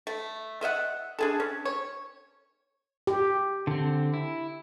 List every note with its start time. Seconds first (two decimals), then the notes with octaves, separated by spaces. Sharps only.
0.07 A3
0.61 A3 D#5 E5 F#5
1.19 D4 G#4 A4
1.40 C#4
1.65 C#5
3.07 G4
3.67 D3 C4
4.14 E4